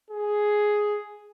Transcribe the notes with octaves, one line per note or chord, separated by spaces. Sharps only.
G#4